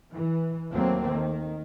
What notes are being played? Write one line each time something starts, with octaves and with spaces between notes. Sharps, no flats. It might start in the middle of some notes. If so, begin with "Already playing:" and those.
E3
D#2 F#3 A3 A#3 C4
D#3